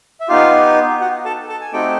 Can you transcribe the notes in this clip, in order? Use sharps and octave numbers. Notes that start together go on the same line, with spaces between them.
E5
B3 D#4 F4 G4 F5
F#4 F#5
A4 A5
A4 A5
G#5
A3 C4 D#4 F#4 G4 A4 G5